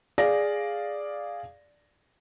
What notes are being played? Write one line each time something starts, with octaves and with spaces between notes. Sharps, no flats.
G#4 D5 F5 A#6